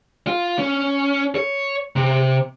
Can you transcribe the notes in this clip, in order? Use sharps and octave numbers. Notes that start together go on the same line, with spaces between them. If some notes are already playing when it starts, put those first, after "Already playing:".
F4
C#4
C#5
C3